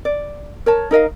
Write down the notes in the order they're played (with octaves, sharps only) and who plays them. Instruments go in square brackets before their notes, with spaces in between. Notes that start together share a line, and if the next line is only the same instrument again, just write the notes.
[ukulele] D5
A#4 C#5 A5
D#4 A#4 D#5 F5